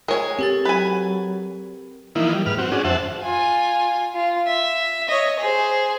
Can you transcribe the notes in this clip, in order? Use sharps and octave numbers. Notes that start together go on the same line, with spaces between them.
G#3 A#4 C#5 G#5
C4 G4 A4 A6
F#3 B4 G#5
E3 F3 A#3 D#4 E4
G3
G#2 B4 F6
C4 F#4
C#4 D4 F#4 G#4
F2 C5 E5 F#5 A5
F4 G#5
F4
E5
C#5 D#5
G#4 C5